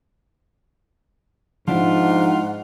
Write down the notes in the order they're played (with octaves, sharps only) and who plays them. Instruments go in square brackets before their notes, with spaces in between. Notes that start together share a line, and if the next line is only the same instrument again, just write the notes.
[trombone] G#2 [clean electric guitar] F3 D4 E4 [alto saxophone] F4 [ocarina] F#5